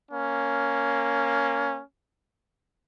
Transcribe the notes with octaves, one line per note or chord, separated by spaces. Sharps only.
A#3 C#4